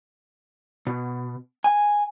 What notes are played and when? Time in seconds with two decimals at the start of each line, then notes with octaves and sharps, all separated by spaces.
0.87 B2
1.64 G#5